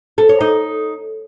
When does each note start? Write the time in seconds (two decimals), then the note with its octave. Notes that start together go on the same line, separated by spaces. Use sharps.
0.18 A4
0.29 C#5
0.41 D#4